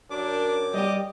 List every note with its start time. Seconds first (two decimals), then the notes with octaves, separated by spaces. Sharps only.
0.10 F#2 D4 D6
0.74 G3 G4 D#5